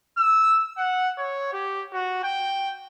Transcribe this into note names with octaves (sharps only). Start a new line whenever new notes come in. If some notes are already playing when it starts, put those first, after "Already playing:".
E6
F#5
C#5
G4
F#4
G5